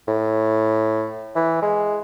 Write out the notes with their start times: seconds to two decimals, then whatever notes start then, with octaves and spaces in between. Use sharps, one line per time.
0.08 A2
1.36 E3
1.62 G#3